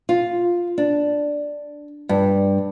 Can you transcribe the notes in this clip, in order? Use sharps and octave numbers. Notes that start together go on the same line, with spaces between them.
F4
D4
G2